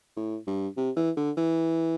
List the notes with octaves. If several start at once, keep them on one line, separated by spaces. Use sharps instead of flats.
A2
G2
C3
E3
D3
E3